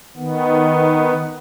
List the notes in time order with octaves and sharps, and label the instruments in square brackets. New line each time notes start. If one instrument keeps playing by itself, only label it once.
[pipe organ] D#3 B3